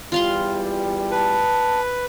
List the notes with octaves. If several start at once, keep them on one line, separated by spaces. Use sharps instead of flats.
E2 E3 G3 F4 F5 C6
B4 A5